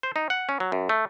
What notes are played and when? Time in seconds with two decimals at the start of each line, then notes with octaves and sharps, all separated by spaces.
0.03 C5
0.16 D#4
0.30 F#5
0.49 C#4
0.60 F#3
0.72 F#2
0.89 A3